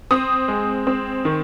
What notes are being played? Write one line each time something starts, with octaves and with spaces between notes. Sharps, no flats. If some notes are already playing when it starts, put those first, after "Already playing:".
C4 D#6
G#3
C4
D#3